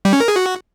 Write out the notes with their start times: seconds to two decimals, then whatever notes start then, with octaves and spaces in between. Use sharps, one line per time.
0.05 G3
0.13 C#4
0.20 A#4
0.28 G#4
0.36 F#4